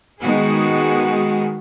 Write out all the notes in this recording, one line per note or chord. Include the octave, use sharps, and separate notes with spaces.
D#3 G#3 B3 D#4 F#4 G#4